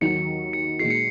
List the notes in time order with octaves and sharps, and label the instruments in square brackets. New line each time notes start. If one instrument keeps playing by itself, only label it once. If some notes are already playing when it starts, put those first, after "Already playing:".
[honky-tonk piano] D#2 D#3 F#3 [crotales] C#7
[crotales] C#7
[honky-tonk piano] A#2 G#3 D#4 F#4 [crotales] C7
[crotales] C#7